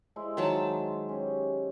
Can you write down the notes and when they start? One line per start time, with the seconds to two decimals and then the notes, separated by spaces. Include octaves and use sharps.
0.16 G#3 E4 C5
0.37 D#3 F#3 A5
1.09 C#4 G4